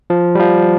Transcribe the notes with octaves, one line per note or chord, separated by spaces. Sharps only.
F3
G3
F3